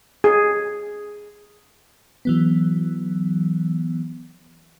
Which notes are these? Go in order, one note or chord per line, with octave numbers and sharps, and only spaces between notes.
G#4
E3 F#3 B3